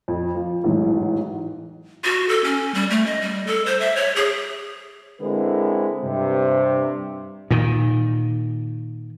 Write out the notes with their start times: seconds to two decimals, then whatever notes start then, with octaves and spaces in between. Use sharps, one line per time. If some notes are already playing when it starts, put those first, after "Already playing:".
0.08 F2
0.35 F3
0.64 A1 E2 G#2 F#3
2.04 F#4
2.29 A4
2.44 C#4
2.74 G3
2.90 A3
3.06 D#5
3.21 G3
3.47 A4
3.66 C5
3.80 E5
3.96 C#5
4.16 G#4
5.21 D3 G#3 C4 E4 A#4 B4
6.04 G2 C3
7.50 A#2 D#3